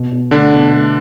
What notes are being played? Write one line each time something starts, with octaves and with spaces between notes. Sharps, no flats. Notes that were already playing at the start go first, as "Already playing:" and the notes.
Already playing: B2
B2
D3 A3 D4
B2
A3